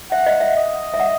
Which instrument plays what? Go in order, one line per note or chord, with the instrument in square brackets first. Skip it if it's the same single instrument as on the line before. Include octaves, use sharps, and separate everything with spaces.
[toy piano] E5 [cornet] F#5
[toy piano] D#5
E5
[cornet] D#5
[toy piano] E5
F#5